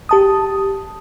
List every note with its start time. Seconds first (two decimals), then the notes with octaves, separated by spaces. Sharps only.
0.09 G4 A5 D#6